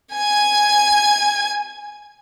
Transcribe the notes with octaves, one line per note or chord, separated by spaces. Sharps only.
G#5 G#6